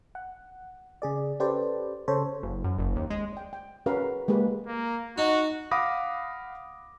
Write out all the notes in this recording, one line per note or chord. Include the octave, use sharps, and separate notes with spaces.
F#5
C#3 G#4 D5
C#4 G4 A4 B4 C5 D5
C#3 A4 C5 C#5
F#1
F#2
F#1
D#2
G#3
D5 G5
G5
C#4 F#4 G#4 A#4 B4 F5
G#3 A#3 G4 B4
A#3
D#4 F#4
F5 F#5 B5 D6 D#6 A#6